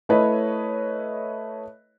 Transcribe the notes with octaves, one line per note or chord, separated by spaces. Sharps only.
A3 E4 B4 C#5 D#5